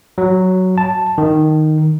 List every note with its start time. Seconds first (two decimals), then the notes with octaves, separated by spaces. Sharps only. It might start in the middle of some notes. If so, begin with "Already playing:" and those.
0.18 F#3
0.78 A5
1.18 D#3